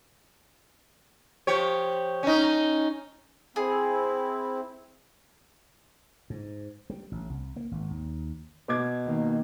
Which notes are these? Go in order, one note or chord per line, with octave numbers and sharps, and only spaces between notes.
F3 G4 C#5
C#4 D#4
C4 E4 G#4
G#2
G3
A1
C2
A#3
G#1
D#2
B2 D6 G#6
D#3 A#3